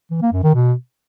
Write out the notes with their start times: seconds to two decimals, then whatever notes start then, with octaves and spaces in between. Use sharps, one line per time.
0.11 E3
0.22 A#3
0.32 F#2
0.43 D#3
0.54 B2